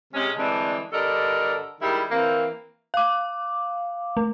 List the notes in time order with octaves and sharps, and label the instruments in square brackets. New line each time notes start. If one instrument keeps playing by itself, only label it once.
[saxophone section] C3 G#3 C#4
D3 E3 G3 G#3 C4 D4
G2 D3 A4 A#4 D5 D#5
D#3 G3 G#3 E4
E3 A#3 C4
[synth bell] F5 D6
A3